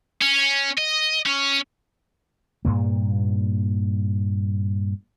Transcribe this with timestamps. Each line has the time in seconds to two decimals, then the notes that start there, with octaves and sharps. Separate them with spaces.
0.22 C#4
0.78 D#5
1.26 C#4
2.65 G2 A#2 A#3